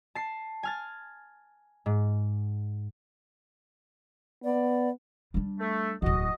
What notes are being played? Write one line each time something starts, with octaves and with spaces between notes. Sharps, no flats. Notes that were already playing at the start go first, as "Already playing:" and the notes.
A5 C7
G#5 F6 A6
G#2
B3 D5
G3 D4
A3
D1 E2 F#4 D#5